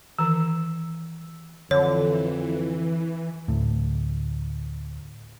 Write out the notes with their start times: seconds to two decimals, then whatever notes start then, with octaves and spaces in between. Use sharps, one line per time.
0.19 D#3 E3 A#5 E6
1.71 F2 D3 E3 C#5
3.48 D2 A2